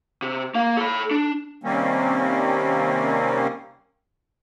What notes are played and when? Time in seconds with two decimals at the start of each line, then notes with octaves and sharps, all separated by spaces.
0.22 C3
0.55 A#3 F5
0.77 A4 B5
1.11 D4
1.64 C3 D#3 G3 A#3 C4 C#4